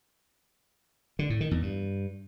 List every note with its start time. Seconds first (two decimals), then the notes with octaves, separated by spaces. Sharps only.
1.19 D3
1.30 A2
1.41 D#3
1.51 E2
1.62 G2